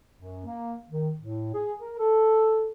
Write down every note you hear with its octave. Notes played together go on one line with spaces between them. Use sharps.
F#2
A#3
D#3
A2
G#4
A#4
A4